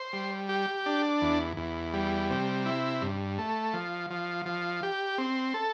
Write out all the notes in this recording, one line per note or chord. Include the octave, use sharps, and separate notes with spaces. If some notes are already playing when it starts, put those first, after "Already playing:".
Already playing: C5
G3
G4
D4
E2
E2
G3
C3
E4
G2
A3
F3
F3
F3
G4
C4
A4